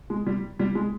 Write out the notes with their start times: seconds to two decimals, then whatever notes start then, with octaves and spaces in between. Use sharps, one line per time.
0.10 G#3
0.26 G3
0.59 G3
0.75 G#3